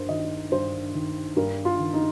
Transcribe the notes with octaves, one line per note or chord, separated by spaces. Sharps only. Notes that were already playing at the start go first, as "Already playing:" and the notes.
Already playing: G2 A#4 C5
D#3 D#5
G2 C5
D#3
G2 A#4
F4
D#3
D#4